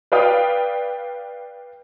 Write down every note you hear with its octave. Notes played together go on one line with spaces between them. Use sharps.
B4 D5 F5 G5 D#6 F6